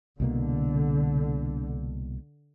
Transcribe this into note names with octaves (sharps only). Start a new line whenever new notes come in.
C2 B2 D3 A#3